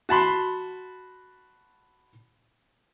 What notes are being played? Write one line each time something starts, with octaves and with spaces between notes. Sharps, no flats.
F#4 A5 B5 C6